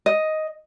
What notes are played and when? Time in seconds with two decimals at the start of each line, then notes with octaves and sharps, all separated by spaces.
0.06 D#5